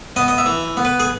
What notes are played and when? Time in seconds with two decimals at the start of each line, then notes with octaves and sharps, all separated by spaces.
0.16 B3 D#5
0.28 D#5
0.38 E5
0.46 E3
0.77 B3
0.85 B4
1.00 G#4